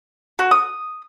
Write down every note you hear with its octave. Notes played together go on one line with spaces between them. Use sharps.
F#4
D#6